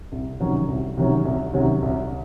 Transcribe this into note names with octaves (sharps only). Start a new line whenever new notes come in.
C2
C3 D#3 F#3 C#4
C2
C3 D#3 F#3 C#4
C2
C3 D#3 F#3 C#4
C2